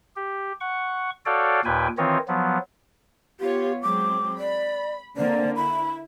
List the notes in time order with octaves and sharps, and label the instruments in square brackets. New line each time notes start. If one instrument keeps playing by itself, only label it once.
[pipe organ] G4
F#5 C#6
F#4 A4 C#5 D5 F5 G5
D#2 A#2 B4 G5 G#5
D#3 E3 C4 F4 C#5 D#5
F3 F#3 B3
[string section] B3 F4 C#5 [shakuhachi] G4
[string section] F#3 G#3 C4 [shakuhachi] D6
[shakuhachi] D5 [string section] B5
[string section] D3 A#3 C4 [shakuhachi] D5
[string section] E4 [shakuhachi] B5